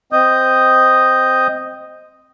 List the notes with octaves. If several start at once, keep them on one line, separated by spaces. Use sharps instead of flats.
C4 D#5 D#6 G6